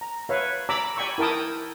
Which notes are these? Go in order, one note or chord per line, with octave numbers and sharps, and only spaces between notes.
A#5
B4 C#5 E5 F5
D5 A#5 B5 D6 E6
D5 G5 G#5 B5 C#6 E6
E4 A#4 G5 A5 D#6